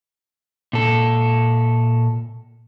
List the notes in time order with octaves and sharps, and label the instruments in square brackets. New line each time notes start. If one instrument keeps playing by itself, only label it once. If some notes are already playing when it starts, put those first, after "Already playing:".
[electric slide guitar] A#2 A4